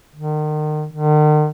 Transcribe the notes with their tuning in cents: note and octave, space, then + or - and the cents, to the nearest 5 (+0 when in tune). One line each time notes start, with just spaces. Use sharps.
D#3 -35
D#3 -45